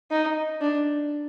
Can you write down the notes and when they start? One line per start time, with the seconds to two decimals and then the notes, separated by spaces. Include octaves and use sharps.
0.11 D#4
0.61 D4